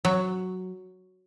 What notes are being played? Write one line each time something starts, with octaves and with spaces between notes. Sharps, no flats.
F#3